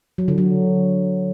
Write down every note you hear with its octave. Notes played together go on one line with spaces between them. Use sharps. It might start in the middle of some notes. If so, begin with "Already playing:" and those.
F#3
D3
F#3